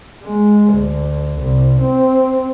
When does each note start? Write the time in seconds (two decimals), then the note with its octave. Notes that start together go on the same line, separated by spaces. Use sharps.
0.23 G#3
0.74 D2
1.40 C2
1.82 C4